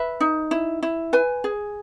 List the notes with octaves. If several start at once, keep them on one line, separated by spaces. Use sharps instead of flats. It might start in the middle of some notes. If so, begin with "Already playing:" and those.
Already playing: B4 E5
D#4
E4
E4
B4 G#5
G#4